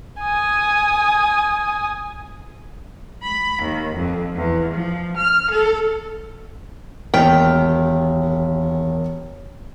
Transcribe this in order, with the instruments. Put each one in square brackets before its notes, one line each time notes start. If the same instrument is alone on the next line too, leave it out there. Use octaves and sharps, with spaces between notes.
[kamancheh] G#5 D#6
[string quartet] B5
D#2
F2
E2
F3
F6
A4
[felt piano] E1 F6 B6 [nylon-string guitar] D#2 G5